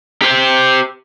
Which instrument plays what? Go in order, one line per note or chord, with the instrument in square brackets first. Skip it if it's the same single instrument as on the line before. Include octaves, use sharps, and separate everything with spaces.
[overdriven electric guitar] G4 C5